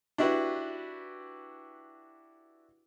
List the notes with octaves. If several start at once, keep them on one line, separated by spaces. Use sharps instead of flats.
D4 E4 F#4 G4 B4